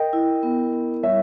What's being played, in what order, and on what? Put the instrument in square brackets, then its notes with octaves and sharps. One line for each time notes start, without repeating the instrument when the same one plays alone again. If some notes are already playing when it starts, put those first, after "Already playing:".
Already playing: [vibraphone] A#4 [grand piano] D#5 G5
[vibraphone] E4
B3
B3
[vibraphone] G3 [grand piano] C#5 E5